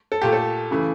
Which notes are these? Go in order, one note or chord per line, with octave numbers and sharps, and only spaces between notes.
A4
A#2 A3 G4
A4
C#3 E3 A3